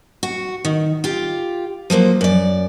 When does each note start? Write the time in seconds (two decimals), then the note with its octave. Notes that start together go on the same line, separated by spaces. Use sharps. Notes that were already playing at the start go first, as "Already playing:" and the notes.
0.23 F#4
0.65 D#3
1.04 F4 G4
1.90 F3 F#3 A#3 C5
2.21 F#2 D5